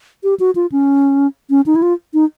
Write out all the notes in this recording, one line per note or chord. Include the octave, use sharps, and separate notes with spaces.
G4
F#4
F4
C#4
C#4
D#4
E4
F4
D#4